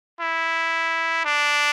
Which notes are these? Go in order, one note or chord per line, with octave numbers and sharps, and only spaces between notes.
E4
D4